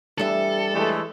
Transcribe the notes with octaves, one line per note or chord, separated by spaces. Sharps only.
E2 G3 D4 A4 E5
E3 G#3 A3